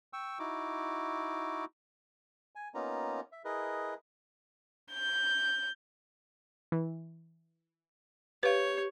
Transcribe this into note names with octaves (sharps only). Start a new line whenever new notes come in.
G5 C#6 E6
D#4 E4 F#4 D6
G#5
A#3 B3 C#4 D#4 F4 A#5
E5
E4 G#4 A#4 B4 D#5
G6
E3
G4 B4 C#5 F5